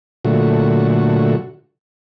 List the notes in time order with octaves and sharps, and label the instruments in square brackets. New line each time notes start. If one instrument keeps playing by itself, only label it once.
[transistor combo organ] A#2 D3 F#3 A3 F#4